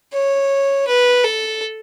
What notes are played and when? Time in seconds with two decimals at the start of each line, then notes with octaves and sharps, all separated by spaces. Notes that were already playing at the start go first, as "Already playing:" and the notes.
0.12 C#5
0.88 B4
1.24 A4